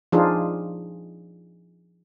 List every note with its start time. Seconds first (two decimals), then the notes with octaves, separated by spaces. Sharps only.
0.12 F3 D4 D#4 F4 G#4